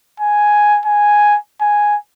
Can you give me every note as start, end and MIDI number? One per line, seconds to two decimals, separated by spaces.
0.20 0.80 80
0.85 1.37 80
1.61 1.96 80